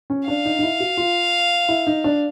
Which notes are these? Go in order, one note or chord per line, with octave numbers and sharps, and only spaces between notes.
C#4
D4 F5
D#4
D#4
E4
F#4
F4
E4
D#4
D4